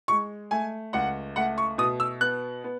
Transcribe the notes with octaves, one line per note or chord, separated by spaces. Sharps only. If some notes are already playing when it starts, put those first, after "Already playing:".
G#3 C#6
A3 G#5
C#2 F#5
A3 F#5
C#6
B2 D#6
E6
B3 F#6
B3